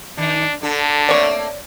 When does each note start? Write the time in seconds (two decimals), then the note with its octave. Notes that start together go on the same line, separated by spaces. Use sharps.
0.18 D#3 D4 D#4
0.62 D3 D4 A4
1.09 A3 A#3 C4 C#5 D5